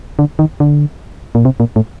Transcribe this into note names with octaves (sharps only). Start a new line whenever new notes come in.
D3
D#3
D3
A#2
C3
A#2
A2